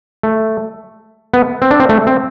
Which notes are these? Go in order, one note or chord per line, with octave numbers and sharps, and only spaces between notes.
A3
B3
C4
D4
C4
A3
C4